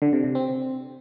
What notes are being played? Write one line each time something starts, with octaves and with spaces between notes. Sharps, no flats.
D3
C3
C3
C4